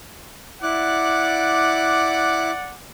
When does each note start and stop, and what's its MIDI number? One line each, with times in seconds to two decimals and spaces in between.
0.63 2.51 64
0.63 2.76 74
0.63 2.76 78
0.63 2.51 86
0.63 2.51 90